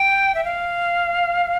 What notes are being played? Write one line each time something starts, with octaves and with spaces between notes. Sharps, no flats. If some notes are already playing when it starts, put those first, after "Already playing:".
Already playing: G5
E5
F5